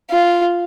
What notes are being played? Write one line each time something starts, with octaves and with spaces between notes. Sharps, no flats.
F4